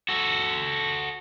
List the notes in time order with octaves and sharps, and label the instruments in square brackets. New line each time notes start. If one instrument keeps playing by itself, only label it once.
[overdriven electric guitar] F#4 A4